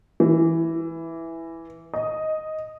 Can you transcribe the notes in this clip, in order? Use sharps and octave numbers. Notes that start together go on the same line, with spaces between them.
E3
D#5